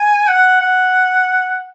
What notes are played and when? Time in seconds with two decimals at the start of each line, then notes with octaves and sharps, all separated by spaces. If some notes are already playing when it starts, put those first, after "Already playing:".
Already playing: G#5
0.28 F#5
0.61 F#5